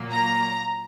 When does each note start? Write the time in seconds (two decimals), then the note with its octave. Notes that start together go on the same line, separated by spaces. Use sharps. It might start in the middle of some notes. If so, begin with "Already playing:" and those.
Already playing: A#2 F#3 A#3
0.11 A#5